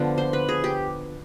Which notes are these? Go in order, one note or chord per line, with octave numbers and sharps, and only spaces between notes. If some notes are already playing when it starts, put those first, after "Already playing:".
Already playing: D3 F3 B3
C5
B4
G#4
G4